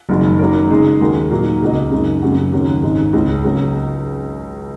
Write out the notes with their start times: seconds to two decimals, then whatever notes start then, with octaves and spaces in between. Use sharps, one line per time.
0.09 F#1 F#2 D#3 G#3 F#4
0.39 D#3 F#3 A#3 C#4 A#4
0.70 C#3 G#3 D#4 G#4
1.00 D#2 D#3 G#3 F#4 A#4
1.30 A#2 F#3 A#3 D#4 F#4
1.62 C#2 C#3 A#3 F#4 D#5
1.91 F#2 C#3 G#3 D#4
2.23 F#2 C#3 A#3 F#4
2.52 D#2 C#3 F#3 C#4
2.83 G#1 G#2 G#3 D#4
3.13 C#2 C#3 G#3 C#4
3.44 C#2 C#3 F#3 A#3 C#4